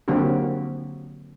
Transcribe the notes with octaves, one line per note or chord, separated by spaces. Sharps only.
D3 F#3 A#3 C4 G4